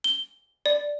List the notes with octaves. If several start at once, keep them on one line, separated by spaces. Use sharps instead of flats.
G7
D5